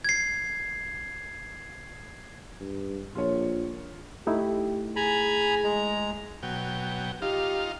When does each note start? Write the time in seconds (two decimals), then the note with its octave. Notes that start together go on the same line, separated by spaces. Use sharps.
0.05 G#6 C7
2.61 G2
3.15 A#1 F4 C#5
4.27 A3 D#4 E4 G4
4.96 G#4 G#5 A#5 B5
5.64 G#3 A#5
6.43 B2 F#3 G5
7.22 D#4 F4 G4 F5